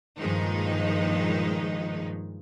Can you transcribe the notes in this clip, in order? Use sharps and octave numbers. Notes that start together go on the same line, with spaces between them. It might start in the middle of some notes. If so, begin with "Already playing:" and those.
G2 A#2 D#3 F3 G#3 D#4